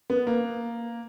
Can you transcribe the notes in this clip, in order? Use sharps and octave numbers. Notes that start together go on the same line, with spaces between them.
B3
A#3